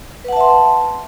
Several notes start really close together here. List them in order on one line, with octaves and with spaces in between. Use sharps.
B4 F#5 A5 E5 C6